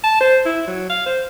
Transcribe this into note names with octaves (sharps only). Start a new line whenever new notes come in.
A5
C5
E4
F#3
F5
C5